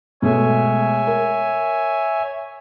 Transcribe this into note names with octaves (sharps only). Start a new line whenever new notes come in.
B2 G#3 A3 C#5 E5 G#5
A#4